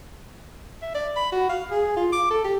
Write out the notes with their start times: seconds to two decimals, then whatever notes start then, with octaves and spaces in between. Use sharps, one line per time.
0.82 E5
0.94 D5
1.16 B5
1.32 F#4
1.49 F5
1.71 G#4
1.96 F4
2.12 D6
2.30 A4
2.44 G4